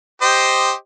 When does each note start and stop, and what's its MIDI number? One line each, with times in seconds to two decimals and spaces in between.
0.22 0.73 67
0.22 0.73 72
0.22 0.73 75